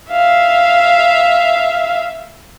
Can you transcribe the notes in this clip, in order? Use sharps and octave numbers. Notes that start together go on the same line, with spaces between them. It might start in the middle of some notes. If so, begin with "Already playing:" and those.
E5 F5